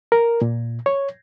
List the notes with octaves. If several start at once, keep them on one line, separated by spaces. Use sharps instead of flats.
A#4
A#2
C#5